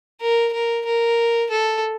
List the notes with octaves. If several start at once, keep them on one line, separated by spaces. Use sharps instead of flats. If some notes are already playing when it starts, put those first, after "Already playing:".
A#4
A#4
A#4
A4